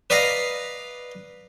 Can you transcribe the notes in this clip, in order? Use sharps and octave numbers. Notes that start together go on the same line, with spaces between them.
B4 D5 D#5 F5 A#5